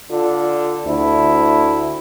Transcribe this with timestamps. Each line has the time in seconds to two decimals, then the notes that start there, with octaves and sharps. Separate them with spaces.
0.11 D3 F4
0.87 D2 E4